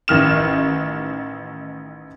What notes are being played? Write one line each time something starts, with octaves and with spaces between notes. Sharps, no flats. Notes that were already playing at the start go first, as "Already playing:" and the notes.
A1 D#3 F6 E7